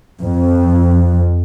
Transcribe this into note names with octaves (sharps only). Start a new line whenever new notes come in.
F2